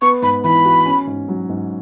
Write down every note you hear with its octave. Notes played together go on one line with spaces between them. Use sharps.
B3 C#6
G#2 B5
E3 B5
F#4
C#4
G#2
F#3
G#2